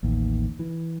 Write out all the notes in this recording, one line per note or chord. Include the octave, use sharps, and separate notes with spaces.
A1 D#2
E3